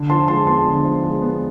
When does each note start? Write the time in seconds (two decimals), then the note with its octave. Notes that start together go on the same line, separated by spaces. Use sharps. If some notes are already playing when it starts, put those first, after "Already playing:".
Already playing: D3
0.10 F3 A5 C6
0.28 G#3 A5 C6
0.47 B3 A5 C6
0.66 D3
0.84 F3
1.03 G#3
1.22 B3